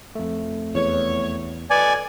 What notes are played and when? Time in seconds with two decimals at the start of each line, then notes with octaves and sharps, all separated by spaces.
0.15 F2 A3
0.75 E2 C#5
1.70 B2 B3 A4 D5 G#5